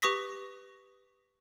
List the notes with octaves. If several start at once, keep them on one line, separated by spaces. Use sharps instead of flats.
G4 B4 C#6 D#6 A#6 B6